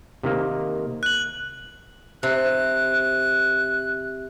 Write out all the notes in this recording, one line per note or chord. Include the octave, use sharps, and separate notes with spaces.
C3 D#3 A#3
F#6 F#7
C3 F#6